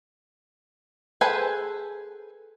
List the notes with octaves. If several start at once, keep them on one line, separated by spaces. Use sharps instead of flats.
G#4 A4 B4 C5 G#5